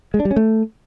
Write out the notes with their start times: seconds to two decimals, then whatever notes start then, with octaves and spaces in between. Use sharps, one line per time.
0.14 G#3
0.20 D4
0.25 G3
0.31 C#4
0.36 A3